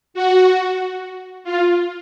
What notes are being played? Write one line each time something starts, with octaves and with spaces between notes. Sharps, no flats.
F#4
F4